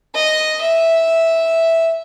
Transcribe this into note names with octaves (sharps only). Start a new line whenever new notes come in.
D#5
E5